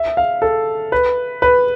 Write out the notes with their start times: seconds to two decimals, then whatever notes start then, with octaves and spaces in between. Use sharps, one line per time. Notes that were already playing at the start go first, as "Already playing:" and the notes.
Already playing: E5
0.17 F5
0.42 A4
0.92 B4
1.42 B4